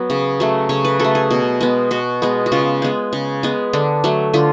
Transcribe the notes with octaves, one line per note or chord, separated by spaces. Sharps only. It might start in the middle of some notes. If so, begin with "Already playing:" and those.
Already playing: F#3 B3
C#3
F#3 A3
C#3 C#5
B4
F#3 A3 A4
G#4
B2
G#3 B3
B2 F#4
G#3 B3
F#4
C#3 F4
G#3 B3
C#3
G#3 B3
D3 D4
F#3 A3
D3 F4